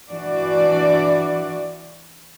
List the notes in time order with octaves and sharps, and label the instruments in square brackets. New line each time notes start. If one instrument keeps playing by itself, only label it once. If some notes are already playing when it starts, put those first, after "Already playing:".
[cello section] E3 D4 F#4 D5